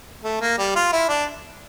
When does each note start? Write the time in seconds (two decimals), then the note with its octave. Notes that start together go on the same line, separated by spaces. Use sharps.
0.23 A3
0.41 A#3
0.58 G3
0.75 F4
0.92 E4
1.08 D4